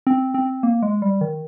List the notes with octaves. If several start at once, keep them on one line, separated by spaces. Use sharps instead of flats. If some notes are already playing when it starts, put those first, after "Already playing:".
C4
C4
A#3
G#3
G3
D#3